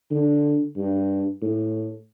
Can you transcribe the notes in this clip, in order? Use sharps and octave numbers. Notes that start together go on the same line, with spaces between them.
D3
G2
A2